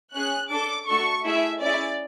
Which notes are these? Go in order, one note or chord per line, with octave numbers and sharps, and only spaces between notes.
C#4 G#4 F#6
D4 A4 D6
A3 D4 F#4 A4 C#6
A3 E4 G#4 E5
C#4 E4 G#4 D5